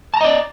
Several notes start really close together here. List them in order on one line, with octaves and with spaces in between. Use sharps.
A5 A#5 D#5 D5